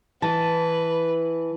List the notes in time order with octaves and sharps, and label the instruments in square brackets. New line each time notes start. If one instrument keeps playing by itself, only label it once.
[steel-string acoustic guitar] E3 [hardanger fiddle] B4 [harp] A5